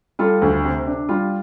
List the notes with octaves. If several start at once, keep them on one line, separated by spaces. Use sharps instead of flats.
G3 F4 A4
D2
C3
D4
G3 F4